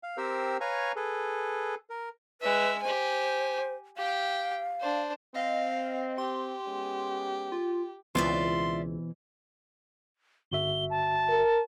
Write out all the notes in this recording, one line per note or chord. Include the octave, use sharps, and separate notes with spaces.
F5
C4 G4 A#4 C5 E6
B4 C#5 F5 G#5 A#5 C#6
G#4 A4 B4
A#4
G#3 B4 E5
G4 C5 G#5
G4 F5 G5
D4 C5
C4 D#5 F5
G4 C6
G#3 B3 C#4
F4
C#2 B2 E3 C4 F4 D5 E5 C6
G1 F#4 E5 G7
A5
A#4